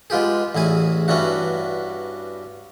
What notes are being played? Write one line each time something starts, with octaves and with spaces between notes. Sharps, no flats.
G#3 B3 F4 G4 G#4
A1 E2 E4 G#4 G#5
G2 B3 C#4 D4 E4 F#4